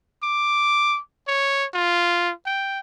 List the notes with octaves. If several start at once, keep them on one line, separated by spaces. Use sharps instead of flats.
D6
C#5
F4
G5